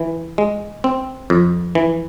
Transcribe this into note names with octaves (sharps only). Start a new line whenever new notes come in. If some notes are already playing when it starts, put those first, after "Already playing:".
Already playing: E3
G#3
C4
F2
E3